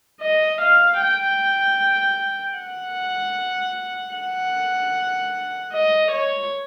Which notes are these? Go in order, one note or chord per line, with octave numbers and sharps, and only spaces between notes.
D#5
F5
G5
F#5
F#5
D#5
C#5